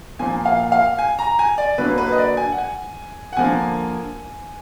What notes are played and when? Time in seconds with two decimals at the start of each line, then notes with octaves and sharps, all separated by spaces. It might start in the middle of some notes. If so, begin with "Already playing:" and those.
0.19 A#2 F3 A#3 G#5
0.46 F5
0.72 F5
0.99 G#5
1.19 A#5
1.39 G#5
1.58 D5
1.78 D3 F#3 A#3 B4
1.98 B4
2.12 D#5
2.18 D5
2.37 G#5
2.52 F#5
2.58 G#5
3.33 F#5
3.37 D3 F3 A#3 G#5